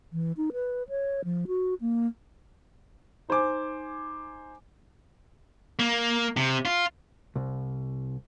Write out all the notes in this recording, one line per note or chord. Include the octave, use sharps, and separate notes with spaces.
E3
D#4
B4
C#5
F3
F#4
A#3
D#4 C5 G#5 D6
A#3
C3
F4
C2